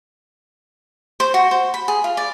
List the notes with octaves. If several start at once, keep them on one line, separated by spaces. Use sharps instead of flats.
C5
F#4
C5
B5
G#4
F4
D5